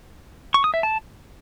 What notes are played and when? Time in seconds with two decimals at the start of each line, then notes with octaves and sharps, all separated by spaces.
0.54 C#6
0.64 D#6
0.74 E5
0.83 A5